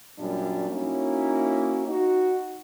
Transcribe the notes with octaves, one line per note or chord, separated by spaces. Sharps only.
F#2 A#2 F#3 G3 D4
A#3 C#4 D#4 E4 F#4
D#4 F#4